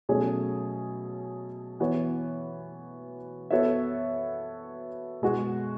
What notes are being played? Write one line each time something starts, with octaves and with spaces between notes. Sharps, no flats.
B2 F#3 A3 C#4 G#4
E3 B3 F#4 C#5
B3 F#4 A4 C#5 E5
B2 G#3 B3 F#4